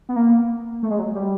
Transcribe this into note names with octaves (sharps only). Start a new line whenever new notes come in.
B3
A#3
A3
G#3
F#3
G3